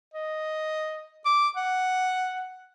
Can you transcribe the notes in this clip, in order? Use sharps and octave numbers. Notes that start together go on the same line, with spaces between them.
D#5
D6
F#5